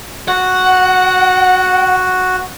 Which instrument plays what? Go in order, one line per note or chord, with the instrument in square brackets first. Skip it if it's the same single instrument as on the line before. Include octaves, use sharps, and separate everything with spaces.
[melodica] F#4 [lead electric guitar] F#5